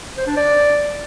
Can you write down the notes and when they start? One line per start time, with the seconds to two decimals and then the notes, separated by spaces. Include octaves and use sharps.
0.17 C5
0.27 D4
0.37 D5